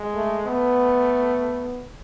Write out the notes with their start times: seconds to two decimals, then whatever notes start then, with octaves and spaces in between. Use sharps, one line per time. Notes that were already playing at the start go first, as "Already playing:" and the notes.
Already playing: G#3
0.15 A3
0.47 A3 B3